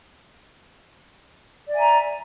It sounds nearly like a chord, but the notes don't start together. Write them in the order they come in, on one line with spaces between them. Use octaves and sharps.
D5 E5 G#5 A#5